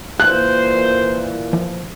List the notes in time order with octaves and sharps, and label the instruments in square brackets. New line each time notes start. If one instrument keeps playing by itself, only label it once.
[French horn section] A#2 E3 [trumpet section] C5 [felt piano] F#6
[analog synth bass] F3